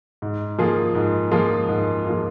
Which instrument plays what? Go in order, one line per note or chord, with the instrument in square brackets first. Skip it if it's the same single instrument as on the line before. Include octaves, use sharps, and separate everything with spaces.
[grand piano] G#2
F3 A#3 F4 G#4
G#2
F3 A#3 F4 G#4
G#2
F3 A#3 F4 G#4